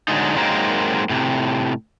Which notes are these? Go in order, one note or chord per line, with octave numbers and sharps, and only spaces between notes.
D3 F#3 G#3 A3 D#4
F#3 G#3 A#3 C4 D#4 A#4
A2 C3